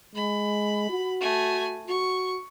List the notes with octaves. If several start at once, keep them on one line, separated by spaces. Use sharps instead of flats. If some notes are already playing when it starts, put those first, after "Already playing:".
G#3 B5
F#4
A3 G#5
F#4 C#6